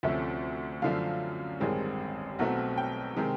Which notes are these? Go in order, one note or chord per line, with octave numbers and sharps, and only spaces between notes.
D2 C3 F3 A3 C#4 E5
F#2 D3 F3 A3 F5
A1 G2 D#3 G#3 C4
B1 B2 F#3 A3 C4 F#5
G5
C3 D#3 G#3 C4